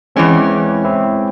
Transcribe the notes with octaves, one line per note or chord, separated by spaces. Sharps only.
E2 E3 G#3 C4 C#4
C4 E4